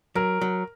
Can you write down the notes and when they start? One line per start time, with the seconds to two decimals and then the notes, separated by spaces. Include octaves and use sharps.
0.15 F#3 A#4
0.41 F#3